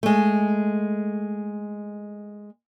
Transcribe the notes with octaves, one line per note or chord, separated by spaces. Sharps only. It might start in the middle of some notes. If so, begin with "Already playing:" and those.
G#3 A3